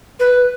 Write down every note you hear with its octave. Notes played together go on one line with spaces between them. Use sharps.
B4